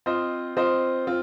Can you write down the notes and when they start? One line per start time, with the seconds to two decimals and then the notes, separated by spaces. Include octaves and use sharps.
0.06 C4 F4 C5 D#5
0.57 C4 F4 C5 D#5
1.07 C4 F4